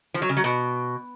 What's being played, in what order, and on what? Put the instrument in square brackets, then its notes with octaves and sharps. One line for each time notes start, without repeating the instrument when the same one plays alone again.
[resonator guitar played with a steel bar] F3
F#3
C#3
F#3
B2